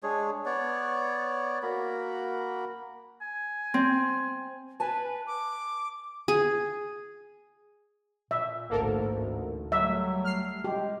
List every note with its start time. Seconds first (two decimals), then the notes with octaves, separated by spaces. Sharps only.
0.03 G#3 D4 G#4 C#5
0.45 B3 C#5 D5
1.63 A#3 F#4 A#4 B5
3.22 G#5
3.74 C4
4.80 B4 G#5 A5
5.27 D6
6.28 G#4
8.31 A#2 E5
8.70 A1 D2 G#2 A#3 A4 A#4
9.72 F#3 G3 A3 E5
10.24 F6 C7
10.64 G#3 G4